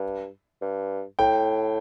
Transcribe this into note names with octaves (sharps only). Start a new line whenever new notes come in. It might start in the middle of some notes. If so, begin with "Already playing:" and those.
Already playing: G2
G2
A2 G5